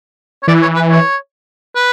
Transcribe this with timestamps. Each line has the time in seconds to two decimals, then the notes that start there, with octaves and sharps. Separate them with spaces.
0.43 C#5
0.47 E3 D5
0.62 C#5
0.76 B4
0.90 C#5
1.75 B4